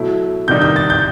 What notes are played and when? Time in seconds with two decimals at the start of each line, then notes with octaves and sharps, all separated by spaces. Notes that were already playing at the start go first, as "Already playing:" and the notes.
Already playing: B2 F#3 A3 E4
0.48 C3 D#3 G3 D#4 G6
0.62 G6
0.76 A6
0.90 G6